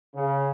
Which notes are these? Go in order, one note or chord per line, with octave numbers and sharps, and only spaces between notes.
C#3